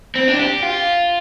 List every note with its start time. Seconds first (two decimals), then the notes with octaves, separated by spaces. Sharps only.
0.16 C4
0.28 D4
0.39 G4
0.63 F4